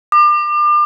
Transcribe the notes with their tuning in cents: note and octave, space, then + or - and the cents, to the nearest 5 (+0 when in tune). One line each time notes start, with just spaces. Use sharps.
D6 +35